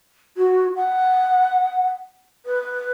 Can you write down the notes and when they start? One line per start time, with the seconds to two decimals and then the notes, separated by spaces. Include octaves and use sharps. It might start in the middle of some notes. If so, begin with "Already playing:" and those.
0.37 F#4
0.76 F#5
2.46 B4